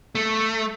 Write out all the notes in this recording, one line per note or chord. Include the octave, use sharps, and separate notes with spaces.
A3